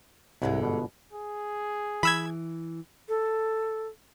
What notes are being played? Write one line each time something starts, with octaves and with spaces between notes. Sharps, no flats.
C2 G#2 D3 G#3
G1 B2
G#4
E3 B5 E6 G#6
A4